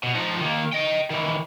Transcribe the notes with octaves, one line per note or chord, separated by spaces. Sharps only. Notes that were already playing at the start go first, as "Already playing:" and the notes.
B2
F3 D#4
D#3 A#3
D#5 G5
D#3 E3